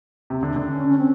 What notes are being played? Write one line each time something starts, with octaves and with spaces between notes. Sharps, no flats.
C3
D3
D3
C#4
C#4
C4